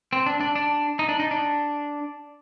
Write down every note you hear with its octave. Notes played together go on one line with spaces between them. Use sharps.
C4
D4
D4
D4
D#4
D4
D#4
D4